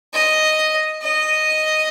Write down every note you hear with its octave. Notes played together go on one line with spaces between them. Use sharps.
D#5
D#5